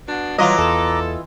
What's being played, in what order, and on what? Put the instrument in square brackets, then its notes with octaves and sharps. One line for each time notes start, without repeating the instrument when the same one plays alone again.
[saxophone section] B2 B3 D4
[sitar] E3 F4 D#5 [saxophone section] F#3 [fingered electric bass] G3 [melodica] A#5 D6
[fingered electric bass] E2 [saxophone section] A4